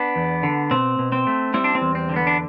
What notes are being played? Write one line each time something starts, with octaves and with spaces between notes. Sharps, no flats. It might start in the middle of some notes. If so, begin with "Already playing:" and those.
Already playing: B3 D4
E2
D3
B2 C4
B2
C4
A3
G3 C4 E4
D4
C4
E2
C4
D3
B3
D4